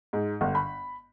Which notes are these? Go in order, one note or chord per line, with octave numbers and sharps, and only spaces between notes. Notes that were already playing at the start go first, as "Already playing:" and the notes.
G#2
G1
B5